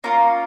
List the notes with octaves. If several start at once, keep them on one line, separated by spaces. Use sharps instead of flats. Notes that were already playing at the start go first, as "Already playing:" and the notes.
A#3 C#4 F4 A#5